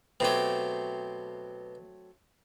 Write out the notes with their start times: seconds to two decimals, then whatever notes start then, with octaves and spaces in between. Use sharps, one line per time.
0.20 B2 F#3 A3 C4 G4